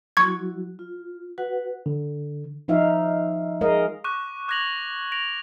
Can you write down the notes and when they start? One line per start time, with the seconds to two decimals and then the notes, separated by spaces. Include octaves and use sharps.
0.17 F#3 E4 F#4 C#6 G#6
0.79 F4
1.38 F#4 B4 F#5
1.86 D3
2.68 F3 D#4 E5 F5
3.61 G#3 A#4 D#5 F5
4.04 C#6 D6 F#6
4.48 D6 F#6 G#6 A#6 F7 F#7
5.12 A#6 D7 F7